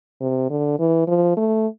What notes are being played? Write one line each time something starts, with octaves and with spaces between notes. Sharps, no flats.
C3
D3
E3
F3
A3